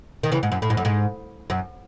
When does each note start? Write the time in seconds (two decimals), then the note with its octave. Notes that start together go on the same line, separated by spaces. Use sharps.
0.23 D#3
0.32 C#3 E3
0.43 G#2
0.52 F#2
0.62 A2
0.70 G#2
0.77 F#2
0.85 G#2
1.50 F#2